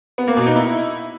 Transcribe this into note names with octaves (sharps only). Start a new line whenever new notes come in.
B3
A#3
B2
D#4
E4